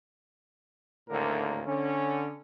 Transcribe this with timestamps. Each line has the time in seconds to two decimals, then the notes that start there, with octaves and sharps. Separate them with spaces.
1.09 G#1 D2 A2 D3 A#3 A#4
1.66 D3 C#4